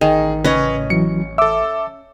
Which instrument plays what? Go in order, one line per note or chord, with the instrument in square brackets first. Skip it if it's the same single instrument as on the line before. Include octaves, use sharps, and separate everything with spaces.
[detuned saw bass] A1 [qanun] D#3 [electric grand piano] G#4
[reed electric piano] C#3 [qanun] C#4 D#5 [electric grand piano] B4 C#5
[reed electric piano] E3 F#3 [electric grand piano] C#7
[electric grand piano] A4 E6 [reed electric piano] E5 D6